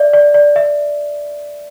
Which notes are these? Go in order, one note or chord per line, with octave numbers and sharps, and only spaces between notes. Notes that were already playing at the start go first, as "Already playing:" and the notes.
Already playing: D5 E5
D5
D5
E5